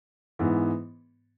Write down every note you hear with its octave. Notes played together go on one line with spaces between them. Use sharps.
G#2 E3 B3